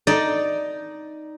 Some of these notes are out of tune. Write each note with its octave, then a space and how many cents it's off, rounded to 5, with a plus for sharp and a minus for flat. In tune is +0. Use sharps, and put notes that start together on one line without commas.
D#4 +0 D5 +0 A5 +15